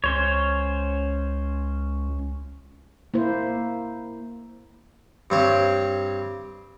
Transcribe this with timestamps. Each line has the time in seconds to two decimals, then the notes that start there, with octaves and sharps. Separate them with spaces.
0.04 C#2 C#4 C5 C#5
3.14 A#3 E4 C5
5.30 G2 C4 C#5